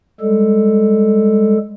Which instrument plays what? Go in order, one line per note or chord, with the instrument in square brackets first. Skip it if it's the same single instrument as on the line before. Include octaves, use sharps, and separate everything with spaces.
[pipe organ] G3 G#3 A4